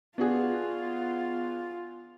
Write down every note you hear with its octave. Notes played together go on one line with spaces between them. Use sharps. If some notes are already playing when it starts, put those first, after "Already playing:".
B3 D4 F4 F#4 G#4